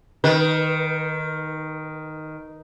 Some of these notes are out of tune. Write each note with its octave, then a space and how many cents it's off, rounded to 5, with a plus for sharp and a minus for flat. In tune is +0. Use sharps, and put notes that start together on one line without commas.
D#3 +0 B4 -30